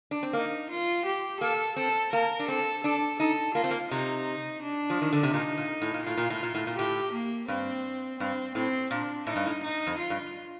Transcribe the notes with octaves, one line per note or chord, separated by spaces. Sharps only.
D4
C4
A#3 D#4
F4
G4
A#3 A4
C4 A4
A#3 A#4
D4
C4 A4
D4 A4
D#4 A4
A#3 F4
C4
A#3
C3 D#4
D4
F3
D#3
D3
C3
A#2 D#4
A#2
A2
A#2
A2 F4
A#2
A2
A#2
A2
A#2
A2 G4
A#3
G2 C4
G2 C4
A2 C4
A#2 D4
A2 D#4
G2
A2
D#4
F2
F4
G2